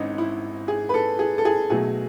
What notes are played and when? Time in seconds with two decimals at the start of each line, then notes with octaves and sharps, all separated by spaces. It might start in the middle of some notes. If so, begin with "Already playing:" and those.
Already playing: G#1 G#2 E3 C#4 D#4
0.18 E4
0.68 G#4
0.89 B4
0.94 A4
1.19 G#4
1.38 A4
1.45 G#4
1.70 B1 B2 F#3 A3 G#4